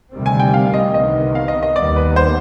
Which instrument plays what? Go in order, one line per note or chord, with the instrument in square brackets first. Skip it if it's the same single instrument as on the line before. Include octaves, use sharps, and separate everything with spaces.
[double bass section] D2 C3 D#3 G3 C4
[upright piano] G#5
G5
F5
D#5
[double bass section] C2 C3 D#3 B3 [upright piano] D#5
[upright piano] F5
D#5
D#5
[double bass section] D#2 D#3 G3 B3 [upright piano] D5
[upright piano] B4
C5